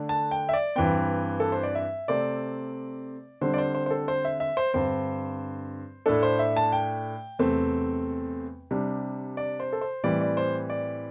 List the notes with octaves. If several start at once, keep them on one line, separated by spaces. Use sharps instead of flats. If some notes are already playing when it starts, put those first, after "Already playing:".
Already playing: D3 A3 D4
A5
G5
E5
D5
G2 E3 C4 G5
A4
C5
D5
E5
C3 A3 C4 D5
D3 G3 C4 C5
D5
C5
C5
C5
A4
C5
E5
E5
C5
G2 D3 C4 C5
A2 A3 D4 A4
C5
E5
A5
G5
E2 C3 A3 C4
C3 G3 D4
D5
C5
A4
C5
A2 E3 G3 C4 D5
D5
C5
D5